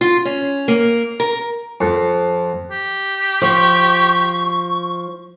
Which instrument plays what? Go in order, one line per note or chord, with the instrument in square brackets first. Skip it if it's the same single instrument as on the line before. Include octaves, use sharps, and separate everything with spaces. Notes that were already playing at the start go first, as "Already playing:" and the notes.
[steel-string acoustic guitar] F4
C#4
A#3
A#4
[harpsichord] F2
[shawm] G4
[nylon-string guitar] F3 [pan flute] C#6